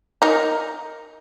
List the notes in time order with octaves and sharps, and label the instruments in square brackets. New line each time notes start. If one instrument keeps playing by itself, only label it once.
[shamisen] D#4 A#4